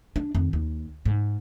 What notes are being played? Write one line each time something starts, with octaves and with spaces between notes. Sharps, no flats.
D4
F2 D#3
D#2
G#2